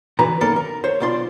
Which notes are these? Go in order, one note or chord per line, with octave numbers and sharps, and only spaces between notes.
B2 D3 E3 F#4 B4 A#5
F#2 D#3 A#3 B3 A4 A#4
A#4
C5 C#5
B1 B2 D4 F4 C6